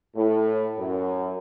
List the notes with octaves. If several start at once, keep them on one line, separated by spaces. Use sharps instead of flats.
A2
F#2